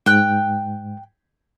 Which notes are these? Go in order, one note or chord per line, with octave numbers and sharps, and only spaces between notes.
G#2 G5 F#6